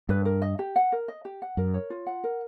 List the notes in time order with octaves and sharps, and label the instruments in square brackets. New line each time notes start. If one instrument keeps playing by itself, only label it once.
[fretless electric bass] G2 [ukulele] B4
[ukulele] A#4
D#5
G4
F#5
A#4
D#5
G4
F#5
[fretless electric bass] F#2 [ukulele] A#4
[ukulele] C#5
F4
F#5
A#4